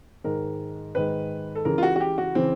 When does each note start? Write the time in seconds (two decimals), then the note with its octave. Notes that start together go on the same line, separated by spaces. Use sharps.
0.24 G#2 D#3 G#3 A#4
0.95 G#2 D#3 G#3 B4
1.55 A4
1.65 C#2 C#3 E3 A#4
1.78 F4
1.83 F#4
1.96 F#4
2.00 G4
2.18 F#4
2.35 C#3 E3 C4